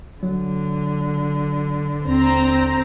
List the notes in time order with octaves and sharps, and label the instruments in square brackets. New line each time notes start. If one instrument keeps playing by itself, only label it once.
[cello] D3 [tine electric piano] F#3
[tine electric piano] D#2 [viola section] C4 A#5